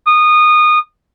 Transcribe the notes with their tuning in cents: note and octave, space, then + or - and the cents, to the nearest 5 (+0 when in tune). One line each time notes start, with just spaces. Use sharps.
D#6 -20